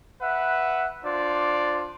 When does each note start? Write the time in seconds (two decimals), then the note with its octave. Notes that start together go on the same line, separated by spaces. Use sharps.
0.21 B4 E5 F#5
1.04 D4 F4 C5 D5